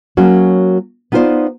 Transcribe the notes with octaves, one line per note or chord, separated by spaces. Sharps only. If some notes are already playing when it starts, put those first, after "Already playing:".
F#3 A#3 C#4 F#4
B3 D#4 F4 G#4 C5 D5